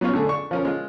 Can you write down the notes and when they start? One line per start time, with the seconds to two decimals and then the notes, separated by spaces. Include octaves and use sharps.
0.01 F#3 B3 C#4 F4 C#5
0.13 D3 A3 G#4
0.27 D4 C#6
0.51 F3 C#4 A#4
0.65 G#3 F4